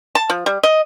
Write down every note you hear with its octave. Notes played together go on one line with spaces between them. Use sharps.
A5
F3
G3
D#5